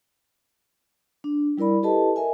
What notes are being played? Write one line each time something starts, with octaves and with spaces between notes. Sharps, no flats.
D4
G3 E4 A#4 D5 B5
E4 G4 A4 B4 D#5 A5
A#4 D#5 E5 G#5